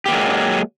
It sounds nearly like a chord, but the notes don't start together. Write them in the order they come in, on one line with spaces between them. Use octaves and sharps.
G4 A#3 F#3 G#3